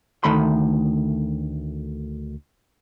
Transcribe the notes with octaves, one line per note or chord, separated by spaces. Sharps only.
D2 D#3 A3 B5 C6